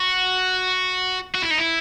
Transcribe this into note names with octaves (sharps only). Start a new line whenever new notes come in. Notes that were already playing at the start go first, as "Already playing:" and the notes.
Already playing: F#4
F#4
E4
D#4
E4